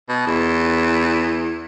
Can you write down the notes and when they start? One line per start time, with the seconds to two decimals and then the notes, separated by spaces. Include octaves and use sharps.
0.09 B2
0.27 E2